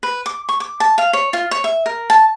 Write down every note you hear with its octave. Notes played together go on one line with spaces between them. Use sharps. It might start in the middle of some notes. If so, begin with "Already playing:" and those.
B4
D6
C#6
D6
A5
F5
C#5
F4
C#5
E5
A#4
A5